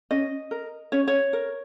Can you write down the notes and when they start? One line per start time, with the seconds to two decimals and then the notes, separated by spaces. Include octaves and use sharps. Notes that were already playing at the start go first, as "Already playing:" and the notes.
0.11 C#4 D#5
0.51 A#4
0.92 C#4 C#5
1.08 C#5
1.33 A#4